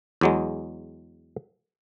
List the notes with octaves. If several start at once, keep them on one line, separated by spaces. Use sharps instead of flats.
E2 F#3 G#3